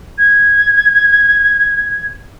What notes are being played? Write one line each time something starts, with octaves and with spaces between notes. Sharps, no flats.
G#6